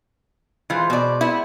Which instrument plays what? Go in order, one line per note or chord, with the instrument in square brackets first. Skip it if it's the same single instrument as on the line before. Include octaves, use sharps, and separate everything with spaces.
[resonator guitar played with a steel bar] E3 F4 [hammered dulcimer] G#3 B4 C5
[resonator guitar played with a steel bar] B2 D5
B3 E4